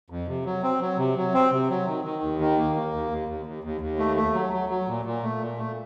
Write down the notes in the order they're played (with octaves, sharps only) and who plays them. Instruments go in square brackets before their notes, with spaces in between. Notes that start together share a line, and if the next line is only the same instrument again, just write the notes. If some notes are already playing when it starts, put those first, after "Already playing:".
[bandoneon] F2
C3
F#3
C4
F#3
C3
F#3
C4
C3
F#3
D#3
D#3
D#2
D#3
A#3
A#3
D#2
D#2
D#2
D#2
D#2
D#2
A3
A3
F#3
F#3
F#3
A#2
A#2
A3
A#2
A3